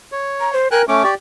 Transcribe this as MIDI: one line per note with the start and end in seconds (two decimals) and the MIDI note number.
0.12 0.55 73
0.40 0.52 82
0.53 0.68 72
0.71 0.85 70
0.71 0.82 79
0.71 0.82 80
0.71 0.82 90
0.88 1.03 57
0.88 1.03 61
0.88 1.09 85
0.88 1.03 86
1.04 1.14 67
1.04 1.14 74